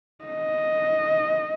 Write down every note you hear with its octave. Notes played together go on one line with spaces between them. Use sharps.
D#5